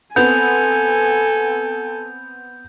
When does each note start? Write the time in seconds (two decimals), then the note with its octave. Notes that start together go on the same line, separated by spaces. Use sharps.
0.16 B3 C4 A4 G#5 G6 F7